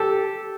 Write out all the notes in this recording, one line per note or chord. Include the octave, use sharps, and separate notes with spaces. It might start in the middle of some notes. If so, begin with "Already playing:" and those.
Already playing: G4 A4